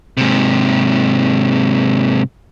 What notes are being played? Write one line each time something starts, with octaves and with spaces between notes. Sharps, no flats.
G#2 C3